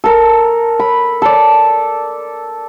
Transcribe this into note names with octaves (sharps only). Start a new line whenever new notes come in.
A4 A#4
B5
A4 D5